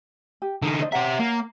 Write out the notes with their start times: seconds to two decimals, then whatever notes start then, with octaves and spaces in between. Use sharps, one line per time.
0.42 G4
0.62 D3 D#4 A4 A#4
0.80 C5 D5 D#5
0.92 G4 C#5 E5 F#5 A#5
1.20 A#3